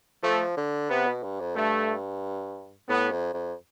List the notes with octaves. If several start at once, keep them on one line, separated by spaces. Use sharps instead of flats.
F3 A3
D3
C3 B3
B2
G2
F2
G2 A3
A2 B3
F2
F2